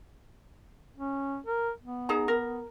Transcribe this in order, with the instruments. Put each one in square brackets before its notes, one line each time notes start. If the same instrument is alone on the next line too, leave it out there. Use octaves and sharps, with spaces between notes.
[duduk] C#4
A#4
B3
[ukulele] D#4 G#4 A#5
A#4